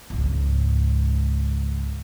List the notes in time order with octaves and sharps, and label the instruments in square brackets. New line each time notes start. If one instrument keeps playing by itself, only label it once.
[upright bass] C#2 G#2